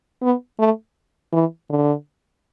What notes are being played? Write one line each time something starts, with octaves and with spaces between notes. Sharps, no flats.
B3
A3
E3
D3